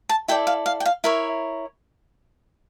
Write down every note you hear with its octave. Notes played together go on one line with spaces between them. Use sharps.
A5
E4 A4 D5 G5
F5
F5
G5
F5
E4 A#4 C#5 E5